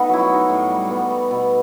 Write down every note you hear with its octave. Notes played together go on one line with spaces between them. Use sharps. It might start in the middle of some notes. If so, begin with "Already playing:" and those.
Already playing: A3 B3 D#4 A4 B4
F#3 E4
F#4
D#4
A2
G3
B3
A3
B2